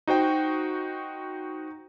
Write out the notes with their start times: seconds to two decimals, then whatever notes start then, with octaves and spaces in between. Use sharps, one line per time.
0.07 D#4 F#4 C5 G5